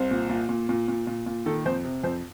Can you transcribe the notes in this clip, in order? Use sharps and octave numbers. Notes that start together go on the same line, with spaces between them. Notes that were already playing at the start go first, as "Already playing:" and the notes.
Already playing: C2 C5
A#2
A#2
A#2
A#2
A#2
A#2
A#2
D#3 A4
F2 C5
C3
F2 C5